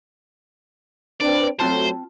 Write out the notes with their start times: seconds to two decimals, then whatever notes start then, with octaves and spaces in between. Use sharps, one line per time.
1.21 C4 D4 B4 D5
1.60 F#3 A3 C4 F4 C5 A5